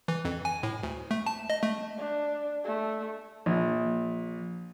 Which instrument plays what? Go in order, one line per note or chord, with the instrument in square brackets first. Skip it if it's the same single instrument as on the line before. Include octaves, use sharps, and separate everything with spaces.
[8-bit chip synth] E3
F2
G#5
A2
D2
A3
A5
D#5
A3
[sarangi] D4
A3
[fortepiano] A#1